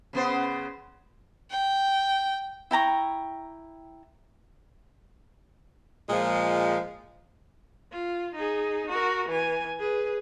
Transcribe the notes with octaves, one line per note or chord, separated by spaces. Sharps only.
C#3 B3 C5
G5
E4 G5 A#5 C#6
A#2 F3 G#3
F4
D#4 G#4
F#4 A#4
E3 G#5
G#4 B4